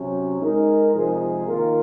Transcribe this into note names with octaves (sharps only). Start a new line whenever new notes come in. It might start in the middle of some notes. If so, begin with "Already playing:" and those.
Already playing: C3 F#3 C#4
G#3 D#4 A#4
C3 F3 G#3 D#4 G#4
D#3 A#3 F4 A#4